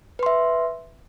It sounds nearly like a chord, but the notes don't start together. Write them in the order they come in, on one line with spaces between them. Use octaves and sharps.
B4 C6 E5